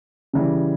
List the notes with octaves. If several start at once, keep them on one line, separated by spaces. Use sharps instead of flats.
C#3 E3 G3